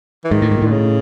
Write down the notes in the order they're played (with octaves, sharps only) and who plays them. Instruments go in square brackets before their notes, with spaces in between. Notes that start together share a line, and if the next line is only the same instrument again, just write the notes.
[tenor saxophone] E3
[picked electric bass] G#2 [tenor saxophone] D#3
[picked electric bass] A2
G#2
A#2
[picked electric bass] A2 [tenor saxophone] D3
[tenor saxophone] C#3